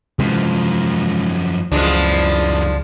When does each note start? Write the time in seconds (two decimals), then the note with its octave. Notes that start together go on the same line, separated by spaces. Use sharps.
0.19 F#2 C3 E3 F3 G#3
1.72 C#2 F#2 E3 F3 G#3 D4